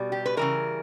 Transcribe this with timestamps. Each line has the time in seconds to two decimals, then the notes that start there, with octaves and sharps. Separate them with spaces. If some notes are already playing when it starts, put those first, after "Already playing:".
Already playing: B2 G3
0.12 G4
0.26 B4
0.37 C#3 E3 G3 A#4